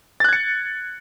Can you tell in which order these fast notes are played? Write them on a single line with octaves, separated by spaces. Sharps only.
A6 F#6 G#6 C#7